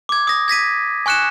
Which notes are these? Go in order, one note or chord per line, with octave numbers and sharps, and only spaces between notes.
D6 G#6
D#6 A#6
G#6 A#6 B6 D#7
G#5 C#6 F#6 C#7 E7